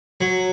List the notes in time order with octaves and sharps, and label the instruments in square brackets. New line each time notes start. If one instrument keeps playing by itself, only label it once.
[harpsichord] F#3